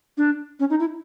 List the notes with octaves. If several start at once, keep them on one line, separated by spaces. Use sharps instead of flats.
D4
C#4
D#4
E4